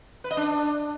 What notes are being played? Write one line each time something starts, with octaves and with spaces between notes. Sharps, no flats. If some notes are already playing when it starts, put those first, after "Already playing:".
B4
D#5
D4